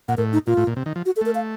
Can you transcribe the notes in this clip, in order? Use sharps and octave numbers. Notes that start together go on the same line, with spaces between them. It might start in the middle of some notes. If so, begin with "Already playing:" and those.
A#2 F#5
A2 A#4
D#4
A#2 F4
A2
A#2
C3
D#3
F3
F#4
A4
A3 A#4
F5